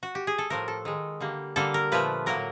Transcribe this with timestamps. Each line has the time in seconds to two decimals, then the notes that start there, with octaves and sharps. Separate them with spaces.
0.03 F#4
0.15 G4
0.27 G#4
0.38 A4
0.50 A2 F3 A3 A#4
0.68 A4
0.85 D#3 G#3
1.20 D3 G3 A#3
1.56 D3 G3 A#3 A4
1.74 A#4
1.92 A#2 F3 A3 B4
2.26 A2 F#3 A#3 A#4